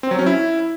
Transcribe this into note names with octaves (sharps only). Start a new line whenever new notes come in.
C4
F#3
C#4
E4